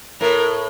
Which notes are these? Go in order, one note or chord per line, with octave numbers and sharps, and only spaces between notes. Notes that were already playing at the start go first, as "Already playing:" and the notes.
A2 A#4